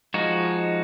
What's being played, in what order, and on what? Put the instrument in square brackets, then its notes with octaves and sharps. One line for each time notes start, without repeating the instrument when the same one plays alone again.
[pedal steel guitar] F3 G#3 D#4 F#4